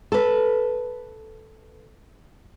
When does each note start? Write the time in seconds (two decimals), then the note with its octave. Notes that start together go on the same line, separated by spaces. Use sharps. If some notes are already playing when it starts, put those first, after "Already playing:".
0.12 A4 B4